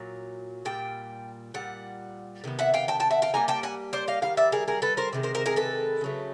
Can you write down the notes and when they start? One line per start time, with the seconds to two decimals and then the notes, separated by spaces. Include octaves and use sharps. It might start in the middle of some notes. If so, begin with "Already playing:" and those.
Already playing: A#2 F#3
0.65 A#2 G3 G5
1.54 A#2 G3 F#5
2.44 C3 D#3 B3
2.59 E5 F#5
2.74 F5 G5
2.88 G5 A5
3.00 G5 A5
3.11 E5 F#5
3.22 F5 G5
3.34 D#3 G3 A#3 G#5 A#5
3.48 G5 A5
3.63 F#5 G#5
3.93 C5 D5
4.08 D#5 F5
4.22 D#3 G3 F5
4.37 D5 E5
4.52 G#4 A#4
4.68 G#4 A#4
4.82 A4 B4
4.97 A#4 C5
5.13 C3 D#3 G#3
5.23 A#4 C5
5.35 A#4 C5
5.46 G#4 A#4
5.56 A4 B4
6.01 C#3 F#3 A3